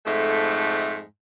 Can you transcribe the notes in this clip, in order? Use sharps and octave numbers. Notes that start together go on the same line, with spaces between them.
F2 G#2 A3